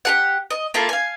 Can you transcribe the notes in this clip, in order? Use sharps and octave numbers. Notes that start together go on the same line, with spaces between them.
G4 G#4 F#5
D#5
A#3 E4 F4 A4
F5 G#5